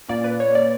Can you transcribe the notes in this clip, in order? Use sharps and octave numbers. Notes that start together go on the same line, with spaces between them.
A#2 A#3 C#4 D5
B4
C#5
D5